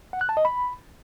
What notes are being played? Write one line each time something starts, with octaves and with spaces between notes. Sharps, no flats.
F#5
F#6
A5
D#5
B5